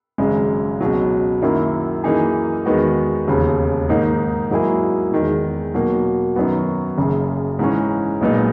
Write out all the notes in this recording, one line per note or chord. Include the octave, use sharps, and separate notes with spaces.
G#1 F#2 C#3 G#3
C#2 B2 F#3
F#2 D#3 A#3 E4
F#2 E3 A#3 D#4 G#4
E2 D#3 G#3 B3 F#4
E1 D#2 C#3
G#2 D#3 A#3 D#4
G#2 F#3 A#3 E4 G#4
E2 D#3 G#3
B2 F#3 A#3
F#2 D#3 F#3 B3 F#4
F#1 F#2 C#3
G#2 E3 G#3 C#4
B1 A#2 G#3 B3 D#4